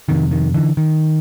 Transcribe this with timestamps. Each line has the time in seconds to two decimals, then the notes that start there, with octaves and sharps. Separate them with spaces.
0.09 F2 C3 D#3
0.31 D#3
0.54 D3 E3
0.77 D#3